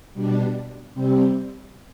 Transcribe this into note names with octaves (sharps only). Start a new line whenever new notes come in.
B2 G3 D4
C3 G3 C4